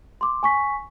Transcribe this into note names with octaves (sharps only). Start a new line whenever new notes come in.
C6 D6
G#5 C#6 B6